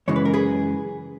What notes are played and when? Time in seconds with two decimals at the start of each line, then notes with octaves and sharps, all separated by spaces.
0.08 F#2 C#3 E3 G#3 C#5
0.16 B4
0.25 A#4
0.34 G#4 B4